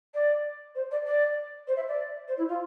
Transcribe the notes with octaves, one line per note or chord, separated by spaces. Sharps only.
D5
C5
D5
D5
C5
E5
D5
C5
E4
F4